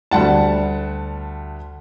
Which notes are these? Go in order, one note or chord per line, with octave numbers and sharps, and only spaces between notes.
D2 G3 F#5 A5